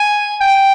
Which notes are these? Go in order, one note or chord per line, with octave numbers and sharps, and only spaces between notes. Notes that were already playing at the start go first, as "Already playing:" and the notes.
Already playing: G#5
G5